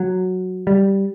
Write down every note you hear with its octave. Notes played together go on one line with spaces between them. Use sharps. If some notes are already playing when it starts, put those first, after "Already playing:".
Already playing: F#3
G3